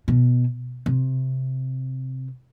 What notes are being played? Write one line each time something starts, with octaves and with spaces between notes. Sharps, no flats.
B2
C3